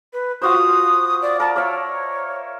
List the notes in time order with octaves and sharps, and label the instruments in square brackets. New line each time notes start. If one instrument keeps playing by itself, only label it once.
[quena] B4
[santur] F4 F#4 C5 [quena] D#6
[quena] D5
[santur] A#4 [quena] A5
[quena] C#5 [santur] D5 E5 F5